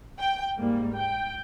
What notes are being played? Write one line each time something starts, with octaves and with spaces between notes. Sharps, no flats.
G5
G#2 G3 A#3
G5